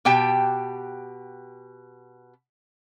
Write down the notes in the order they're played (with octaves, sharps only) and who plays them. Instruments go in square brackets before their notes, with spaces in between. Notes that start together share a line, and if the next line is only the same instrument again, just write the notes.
[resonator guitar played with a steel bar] B2 G4 G5 A5